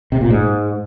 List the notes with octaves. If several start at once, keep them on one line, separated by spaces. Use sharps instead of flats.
C3
A#2
G#2